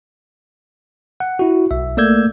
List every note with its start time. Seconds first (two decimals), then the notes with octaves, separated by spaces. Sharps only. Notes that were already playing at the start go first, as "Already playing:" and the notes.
1.20 F#5
1.39 E4 F#4
1.71 B1 E5
1.97 A3 A#3 D5 E6 G6 G#6